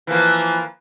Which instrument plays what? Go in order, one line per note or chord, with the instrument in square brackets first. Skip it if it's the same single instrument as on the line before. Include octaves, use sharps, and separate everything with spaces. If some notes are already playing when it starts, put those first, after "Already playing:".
[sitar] E3 F3 A#3